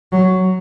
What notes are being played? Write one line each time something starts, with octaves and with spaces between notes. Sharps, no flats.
F#3